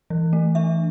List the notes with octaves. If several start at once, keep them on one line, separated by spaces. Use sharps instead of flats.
E3
A3
D4 E5